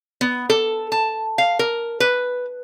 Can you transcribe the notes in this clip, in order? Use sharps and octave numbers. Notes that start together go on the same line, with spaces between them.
B3
A4
A5
F5
A#4
B4